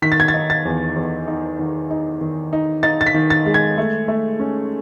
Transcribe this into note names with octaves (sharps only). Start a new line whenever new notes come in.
D#3 B6
A6
G#6
A6
D#4
A6
E2
E2
D#4
D#3
D#4
D#3
D#4
D#4 A6
A6
B6
D#3
A6
G#3
G#6
A3
A3
C#4